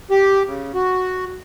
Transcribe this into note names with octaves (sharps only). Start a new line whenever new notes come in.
G4
C#3
F#4